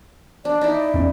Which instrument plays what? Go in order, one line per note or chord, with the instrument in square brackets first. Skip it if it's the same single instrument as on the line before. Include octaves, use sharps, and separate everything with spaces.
[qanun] D4 [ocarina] D5
[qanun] D#4 E4 [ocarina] D5
[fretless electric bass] E2 C#4